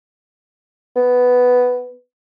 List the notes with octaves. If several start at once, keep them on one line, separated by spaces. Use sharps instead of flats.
B3